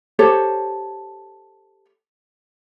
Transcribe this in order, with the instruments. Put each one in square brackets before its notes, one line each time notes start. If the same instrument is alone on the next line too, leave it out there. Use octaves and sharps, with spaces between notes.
[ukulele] G4 A4 C5 C#5